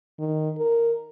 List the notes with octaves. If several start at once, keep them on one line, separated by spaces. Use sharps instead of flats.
D#3
A#4